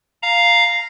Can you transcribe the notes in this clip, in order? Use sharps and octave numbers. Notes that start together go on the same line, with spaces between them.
F5 A#5